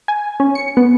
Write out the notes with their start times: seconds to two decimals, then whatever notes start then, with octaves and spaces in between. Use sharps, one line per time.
0.08 G#5
0.40 C#4
0.55 C#7
0.77 B3